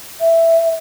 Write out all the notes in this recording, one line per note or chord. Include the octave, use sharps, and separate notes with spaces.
E5